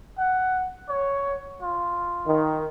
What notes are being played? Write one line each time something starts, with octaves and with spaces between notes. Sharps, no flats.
F#5
C#5
F4
D#3